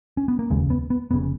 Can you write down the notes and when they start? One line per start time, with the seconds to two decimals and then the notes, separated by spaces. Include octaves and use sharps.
0.17 C#4
0.28 B3
0.39 A#3
0.50 F1 D#2 C#3 G#3
0.70 B3
0.90 B3
1.11 F1 C#3 B3